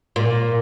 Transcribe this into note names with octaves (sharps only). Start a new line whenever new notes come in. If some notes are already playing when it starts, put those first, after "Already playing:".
A#2